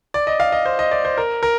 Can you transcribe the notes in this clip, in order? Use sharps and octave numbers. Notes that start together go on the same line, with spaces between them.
D5
D#5
F5
D#5
C5
D#5
D5
C5
A#4
A#4